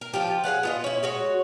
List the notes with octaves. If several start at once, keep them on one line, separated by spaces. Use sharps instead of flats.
A#4
F3 F4 G4
G#4 B4 F5 F#5
B3 F4 D#5
C#4 E4
G#3 F#4 C#5